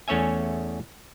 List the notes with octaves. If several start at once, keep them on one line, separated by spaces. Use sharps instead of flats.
E2 A3 C#4 C#5 E5 G#5